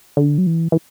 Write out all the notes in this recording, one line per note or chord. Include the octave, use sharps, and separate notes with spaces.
D3
F#3
E3
E3